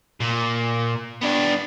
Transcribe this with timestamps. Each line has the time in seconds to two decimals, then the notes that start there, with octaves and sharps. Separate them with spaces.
0.20 A#2
1.22 B3 D4